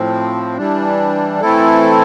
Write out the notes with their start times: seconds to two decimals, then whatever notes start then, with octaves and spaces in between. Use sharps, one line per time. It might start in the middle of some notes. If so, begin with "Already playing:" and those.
Already playing: A2 F3 C4
0.57 E3 G3 D4
1.41 E3 A3 C4 E4 A4